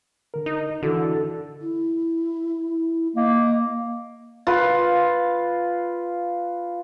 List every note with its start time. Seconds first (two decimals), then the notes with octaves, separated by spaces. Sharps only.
0.34 D3 A#4
0.46 D#4
0.83 D3 E3 E4 F#4 A4
1.62 E4
3.16 A#3 D#5
4.47 F4 B4